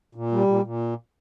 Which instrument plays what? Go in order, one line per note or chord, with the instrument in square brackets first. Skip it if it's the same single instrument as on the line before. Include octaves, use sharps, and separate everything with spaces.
[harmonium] A#2
G3
A#2
A#2